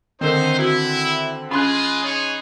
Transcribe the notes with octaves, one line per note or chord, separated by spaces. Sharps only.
D3 D#3 A3 C4 D#4 A#4 C5 E6
E4 F#4
G#3 C#4 F4 G#4 B5 C6 F#6
D#4 G#4 C#5